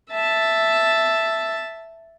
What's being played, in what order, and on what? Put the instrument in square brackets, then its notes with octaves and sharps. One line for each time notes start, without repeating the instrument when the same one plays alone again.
[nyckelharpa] E5 A5